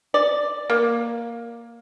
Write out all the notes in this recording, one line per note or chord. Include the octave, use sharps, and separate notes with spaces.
D5
A#3